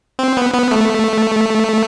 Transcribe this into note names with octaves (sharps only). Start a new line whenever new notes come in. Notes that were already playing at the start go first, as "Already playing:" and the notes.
C4
B3
B3
A3